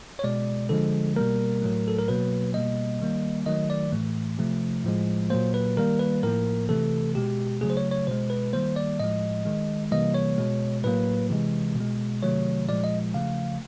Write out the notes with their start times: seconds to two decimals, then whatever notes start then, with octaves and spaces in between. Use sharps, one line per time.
0.19 C#5
0.24 B2 G#3 D5
0.69 D3 F3 G#3 A4
1.16 B2 G3 A#3 A#4
1.62 A2 F#3 A3
1.88 A4
1.99 A#4
2.08 B2 F#3 A#3 B4
2.54 B2 G3 A#3 D#5
3.01 D#3 G3 A#3
3.46 D#3 F#3 A3 D#5
3.70 D5
3.92 A2 E3 A3
4.38 C3 F3 A3
4.84 A2 F3 G#3
5.30 A#2 F#3 A#3 C5
5.54 B4
5.77 D#3 G3 A#3 A#4
5.99 B4
6.23 A2 F3 A#3 A#4
6.69 C3 E3 A3 A4
7.15 B2 G#3 G4
7.61 C#3 F#3 A3 G#4
7.70 C5
7.77 C#5
7.91 C#5
8.07 B2 G#3 C5
8.30 B4
8.53 D#3 G3 A#3 C5
8.76 D5
9.00 A2 F3 G#3 D#5
9.46 D#3 G#3
9.92 C3 E3 G3 A#3 D#5
10.14 C#5
10.38 B2 G#3
10.84 A2 F#3 A#3 B4
11.30 C3 E3 G#3
11.76 B2 G#3
12.23 C3 D#3 F#3 A3 C#5
12.68 A#2 F3 G#3 D5
12.84 D#5
13.14 C#3 F3 A3 F5